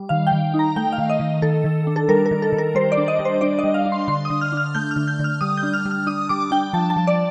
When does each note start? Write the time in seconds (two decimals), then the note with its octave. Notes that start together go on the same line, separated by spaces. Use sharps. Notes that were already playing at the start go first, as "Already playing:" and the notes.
Already playing: G3
0.09 D#3 F5
0.27 G5
0.32 D#3
0.54 D#4
0.59 A#5
0.76 A3 G5
0.92 F5
0.98 D#3
1.10 D#5
1.20 D#3
1.42 D#3 A4
1.64 D#3
1.87 D4
1.96 A4
2.08 G3 A#4
2.26 A#4
2.31 D#3
2.42 A4
2.53 D#3
2.58 A#4
2.75 G3 C5
2.92 D5
2.97 D4
3.08 D#5
3.19 G3
3.25 C5
3.41 D4 D5
3.59 D#5
3.64 G3
3.74 F5
3.86 D4
3.92 C6
4.08 D3 C6
4.25 D#6
4.30 D3
4.41 F6
4.52 D4 F6
4.75 A3 G6
4.91 F6
4.96 D3
5.08 G6
5.19 D3 F6
5.41 G3 D#6
5.57 G6
5.63 D4
5.74 F6
5.86 G3
5.91 F6
6.07 D4 D#6
6.29 G3 D6
6.51 D4 G5
6.73 F3 A5
6.90 A5
6.96 F3
7.07 D5